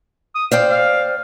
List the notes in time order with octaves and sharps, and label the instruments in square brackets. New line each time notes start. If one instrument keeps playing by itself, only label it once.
[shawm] D#6
[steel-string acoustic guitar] C5 D5 G5 [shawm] F5
[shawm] F5